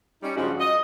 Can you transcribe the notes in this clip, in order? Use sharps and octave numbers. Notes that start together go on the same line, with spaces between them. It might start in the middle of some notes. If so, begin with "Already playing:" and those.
G3 C#4 D#4
G2 C#3 F3 G#3 C#4 F#4
D#5